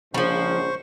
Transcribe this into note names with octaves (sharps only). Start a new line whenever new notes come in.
A#1 G#2 C#3 F3 G3 C5 C#6